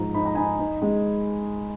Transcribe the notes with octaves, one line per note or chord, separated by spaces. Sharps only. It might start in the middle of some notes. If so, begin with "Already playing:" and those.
Already playing: G#2 F3 A#5
D#4 B5
A#5
D#4 G#5 B5
D#4
G#3